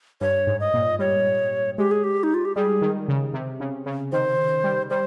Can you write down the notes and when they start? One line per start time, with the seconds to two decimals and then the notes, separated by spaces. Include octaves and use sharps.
0.21 G2 C#5
0.47 G#2
0.60 D#5
0.74 A#2
0.99 G3 C#5
1.78 G#3 G4
1.91 G#4
2.04 G4
2.23 D#4
2.34 F4
2.45 G4
2.55 G3 G#4
2.82 D#3
3.08 C#3
3.34 C3
3.60 C#3
3.86 C#3
4.12 D#3 C5
4.64 G3
4.90 G3 C5